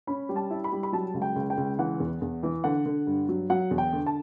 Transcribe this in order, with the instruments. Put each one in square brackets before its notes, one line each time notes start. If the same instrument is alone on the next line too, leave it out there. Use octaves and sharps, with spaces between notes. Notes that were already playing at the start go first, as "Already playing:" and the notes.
[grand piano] C#4 B5
G3
A5
E4
B5
G3
B5
F#3 A5
C#2
G5
C#2
G5
C#2
E3 F#5
E2
E2
E3
D3 F#5
D3
G2
F#3
F#3 F#5
E2
G5
D3
A5